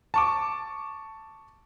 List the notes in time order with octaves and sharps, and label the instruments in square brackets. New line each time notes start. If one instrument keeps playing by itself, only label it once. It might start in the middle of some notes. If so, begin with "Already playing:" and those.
[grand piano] A5 C#6 D6